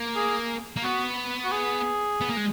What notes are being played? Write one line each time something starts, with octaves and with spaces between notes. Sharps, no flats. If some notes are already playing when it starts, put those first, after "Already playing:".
Already playing: A#3
G#4
A#3
B3 F#4
F#4
G#4
B3
A#3
G#3